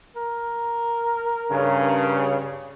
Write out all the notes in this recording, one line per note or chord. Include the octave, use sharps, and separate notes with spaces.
A#4
G2 C#3